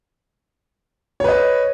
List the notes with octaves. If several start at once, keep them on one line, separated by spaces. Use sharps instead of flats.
B4 C#5 D#5